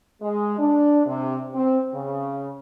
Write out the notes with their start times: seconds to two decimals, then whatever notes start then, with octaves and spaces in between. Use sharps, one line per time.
0.22 G#3
0.59 D4
1.07 C3
1.55 C4
1.94 C#3